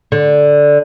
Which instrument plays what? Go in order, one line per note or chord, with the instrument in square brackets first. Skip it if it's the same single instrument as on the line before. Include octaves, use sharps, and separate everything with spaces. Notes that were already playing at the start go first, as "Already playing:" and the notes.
[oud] D3